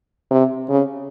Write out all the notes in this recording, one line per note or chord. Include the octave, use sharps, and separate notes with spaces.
C3
C#3